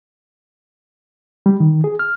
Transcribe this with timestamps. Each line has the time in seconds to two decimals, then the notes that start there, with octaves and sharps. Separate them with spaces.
1.46 G3
1.60 D#3
1.84 G#4
1.99 F6